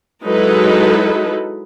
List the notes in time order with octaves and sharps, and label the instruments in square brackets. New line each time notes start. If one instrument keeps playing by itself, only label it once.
[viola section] F#3 G#3 D#4 E4 A4 B4